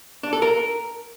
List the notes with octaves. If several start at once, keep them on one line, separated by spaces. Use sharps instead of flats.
D4
A4
A#4